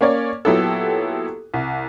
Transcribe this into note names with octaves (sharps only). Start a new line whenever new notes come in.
A#3 C#4 C#5 D5
A#2 F#3 B3 E4 G4 A4
C2